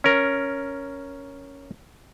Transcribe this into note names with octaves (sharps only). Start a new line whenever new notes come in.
C#4 A#4